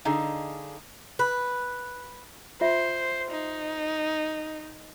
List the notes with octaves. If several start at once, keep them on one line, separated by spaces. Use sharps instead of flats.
D3 D#4 G#4 D#5 F5
B4
F4 C5 E5
D#4